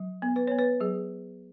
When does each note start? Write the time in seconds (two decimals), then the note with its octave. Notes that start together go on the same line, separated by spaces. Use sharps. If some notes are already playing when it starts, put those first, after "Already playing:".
Already playing: F#3
0.22 B3
0.36 B4
0.47 B3 C#5
0.59 B4
0.80 F#3 G#4